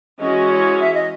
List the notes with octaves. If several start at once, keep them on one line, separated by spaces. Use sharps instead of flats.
E3 G#3 C#4 F#4 D#5
C#5
E5
D#5